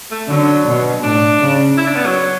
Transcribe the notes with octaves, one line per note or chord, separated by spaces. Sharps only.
A3
D3 F#3
B2
A2 D4
C#3
E4
D4
B3
F#3